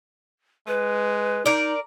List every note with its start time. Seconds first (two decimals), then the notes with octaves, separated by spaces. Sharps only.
0.67 G#3 B4
1.46 D#4 A#4 D5